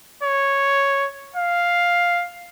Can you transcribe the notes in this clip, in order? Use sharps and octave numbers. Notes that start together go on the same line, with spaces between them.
C#5
F5